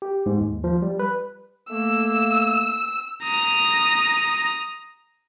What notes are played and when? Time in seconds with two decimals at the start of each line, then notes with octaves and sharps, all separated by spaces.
0.02 G4
0.26 G#2
0.40 D#2
0.64 F3
0.82 G3
0.99 B4
1.70 A3 A#3 E6
3.23 A#5 D#6